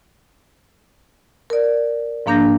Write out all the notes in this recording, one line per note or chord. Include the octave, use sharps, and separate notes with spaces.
A#4 D5
G#2 F3 A#3 D4 G6 A#6